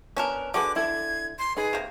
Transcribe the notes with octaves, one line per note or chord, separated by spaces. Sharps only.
B3 C#4 D4 A#4
D3 F#4 G#4 B4 D6
E4 A4 G#6
C6
D#4 G#4 B4
C3 A#3